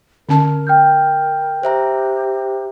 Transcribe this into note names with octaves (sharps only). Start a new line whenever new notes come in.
D3 C#4 A#4 A5
G5 F6 G6
G4 C5 E5 A#5